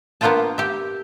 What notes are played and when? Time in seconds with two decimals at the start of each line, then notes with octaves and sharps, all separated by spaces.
0.21 A#3 B3 D4 F4 G5 A5
0.58 G4 E5